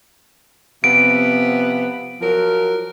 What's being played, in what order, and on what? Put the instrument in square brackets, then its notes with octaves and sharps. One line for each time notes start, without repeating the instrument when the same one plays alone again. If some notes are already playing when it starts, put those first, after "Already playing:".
[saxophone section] C3 F3 B3 [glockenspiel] D7
[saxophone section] F3 F#3 A#4